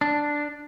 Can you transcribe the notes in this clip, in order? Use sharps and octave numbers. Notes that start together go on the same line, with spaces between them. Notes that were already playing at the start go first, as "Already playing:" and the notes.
D4